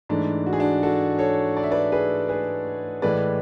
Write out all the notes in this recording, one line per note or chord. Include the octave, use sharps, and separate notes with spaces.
G#2 E3 A3 D4
F#4
G#4
D4 F#4
F#4 A4
A4 C#5
D5
E5
B4 D5
G#4 B4
G#4 B4
A2 E3 G#3 B4 D5